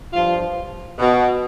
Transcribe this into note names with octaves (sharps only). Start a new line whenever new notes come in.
G2 F3 F4
B2